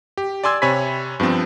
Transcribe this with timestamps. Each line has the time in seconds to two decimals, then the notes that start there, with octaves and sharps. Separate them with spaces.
0.17 G4
0.44 D5 G#5 C6 E6 G#6
0.62 C3 C#5 G#5 B5 B6
1.20 G2 F3 B3 C4